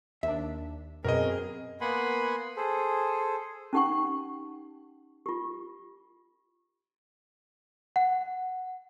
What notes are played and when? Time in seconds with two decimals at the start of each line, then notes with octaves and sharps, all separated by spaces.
0.23 D#2 D4 E5
1.04 F#2 B2 C4 G#4 A#4 D#5
1.81 A#3 B3 F#5 G#5 B5 C6
2.57 G#4 A4 C5
3.73 C#4 D#4 G4 F#5 G5 C#6
5.26 F4 G4
7.96 F#5